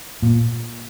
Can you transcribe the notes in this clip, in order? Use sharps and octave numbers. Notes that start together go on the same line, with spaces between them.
A#2